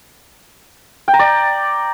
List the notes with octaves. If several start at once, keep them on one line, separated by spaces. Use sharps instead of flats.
G5
A#5
D5